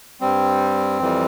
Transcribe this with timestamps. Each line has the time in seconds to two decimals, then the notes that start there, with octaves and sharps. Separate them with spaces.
0.21 G2 G3 C4
0.99 F2 E3 G3